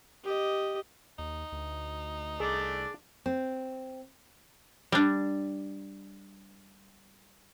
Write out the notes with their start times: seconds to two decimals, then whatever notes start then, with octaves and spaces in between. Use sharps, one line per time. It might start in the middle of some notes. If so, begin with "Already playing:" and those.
0.24 G4 D#5
1.19 D#2 D#4
1.52 D2
2.40 C2 A3 D4 G#4 D5
3.26 C4
4.92 G3 D4